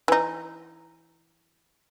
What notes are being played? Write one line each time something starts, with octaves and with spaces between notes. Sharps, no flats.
E3 D#4